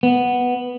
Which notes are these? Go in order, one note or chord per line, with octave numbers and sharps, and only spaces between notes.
B3